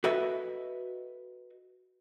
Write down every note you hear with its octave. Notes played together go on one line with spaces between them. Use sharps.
F#4 A4 B4 D#5 E5